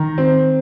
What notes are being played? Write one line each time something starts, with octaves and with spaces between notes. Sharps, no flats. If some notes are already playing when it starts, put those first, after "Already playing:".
Already playing: D#3 A#5
C4